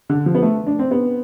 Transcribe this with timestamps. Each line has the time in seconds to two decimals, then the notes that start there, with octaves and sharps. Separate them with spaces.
0.09 D3
0.26 F3
0.35 B3
0.42 A3
0.67 D4
0.79 C4
0.91 B3